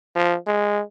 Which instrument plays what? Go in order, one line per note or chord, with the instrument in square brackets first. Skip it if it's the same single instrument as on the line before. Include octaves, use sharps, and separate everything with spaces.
[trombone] F3
G#3